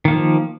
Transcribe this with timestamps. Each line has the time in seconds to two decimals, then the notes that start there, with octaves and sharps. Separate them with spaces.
0.05 D#3
0.08 A#3
0.11 F3